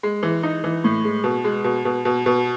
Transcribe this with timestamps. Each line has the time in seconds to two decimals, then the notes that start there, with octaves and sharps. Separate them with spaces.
0.03 G#3
0.23 E3
0.43 D#4
0.64 E3
0.84 A2
1.04 G#3
1.24 B2
1.44 G#3
1.64 B2
1.85 B2
2.05 B2
2.26 B2